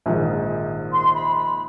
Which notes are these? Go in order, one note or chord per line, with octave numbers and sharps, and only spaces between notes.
A#1 G#2 D#3
C6
B5
B5